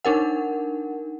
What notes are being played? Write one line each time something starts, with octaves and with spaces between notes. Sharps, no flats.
D4 D#4 A#4 F#5